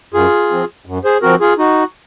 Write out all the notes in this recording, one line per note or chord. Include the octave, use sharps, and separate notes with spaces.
F#2 F4 G#4
F3 C4
F#2
G#4 C5
F3 C4 F#4 A#4
F4 G#4
D#4 F#4